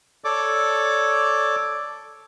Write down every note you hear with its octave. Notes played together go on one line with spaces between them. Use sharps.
A4 C#5 D5 D6